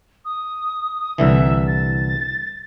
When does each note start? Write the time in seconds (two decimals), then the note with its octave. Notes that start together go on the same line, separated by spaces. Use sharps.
0.25 D#6
1.18 C2 D3 E3 E5
1.67 A6